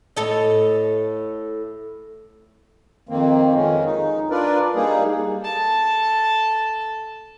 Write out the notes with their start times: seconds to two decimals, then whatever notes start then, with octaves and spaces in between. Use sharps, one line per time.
0.17 A2 A4 D#5
3.09 F2 D#3 A#3 C4
3.55 F2 D#3 G#3 C#4
3.85 D#4
4.31 D4 F4 A#4 B4 D5
4.75 G3 A#3 D#4 G#4
5.42 A4 A5